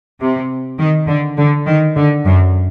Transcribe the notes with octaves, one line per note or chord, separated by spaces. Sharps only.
C3
D#3
D3
D3
D#3
D3
F#2